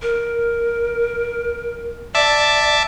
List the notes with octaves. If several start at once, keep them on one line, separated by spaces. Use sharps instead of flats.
A#4
D5 E5 A5 D6